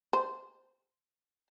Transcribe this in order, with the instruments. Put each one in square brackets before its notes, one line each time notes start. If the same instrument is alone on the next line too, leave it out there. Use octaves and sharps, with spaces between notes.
[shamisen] C5